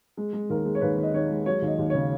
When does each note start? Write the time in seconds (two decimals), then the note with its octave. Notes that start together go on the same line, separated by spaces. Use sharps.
0.17 G#3
0.33 G#3
0.50 D#2 A#4
0.65 G#3
0.75 C#5
0.81 D#2 B4
0.97 D#3
1.03 D#5
1.13 D#3 C#5
1.30 G#3
1.46 F#3 C#5
1.62 D#2
1.67 D#5
1.78 D#2
1.90 C#3 C#5